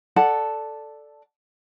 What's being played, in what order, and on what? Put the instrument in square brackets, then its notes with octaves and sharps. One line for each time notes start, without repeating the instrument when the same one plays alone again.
[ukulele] A4 D5 F#5 A5